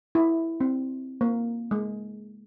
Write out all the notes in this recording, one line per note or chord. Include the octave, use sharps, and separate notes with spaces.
E4
C4
A#3
G#3